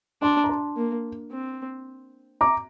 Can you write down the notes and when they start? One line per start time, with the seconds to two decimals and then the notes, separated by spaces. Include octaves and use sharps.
0.22 D4 A5 C6
0.44 A#5
0.49 A5 C6
0.77 A#3
1.32 C4
2.41 A#5 D6